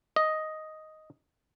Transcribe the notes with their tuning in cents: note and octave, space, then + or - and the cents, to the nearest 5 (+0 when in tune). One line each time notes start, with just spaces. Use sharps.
D#5 +5